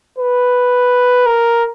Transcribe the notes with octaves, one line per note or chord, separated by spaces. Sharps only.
B4
A#4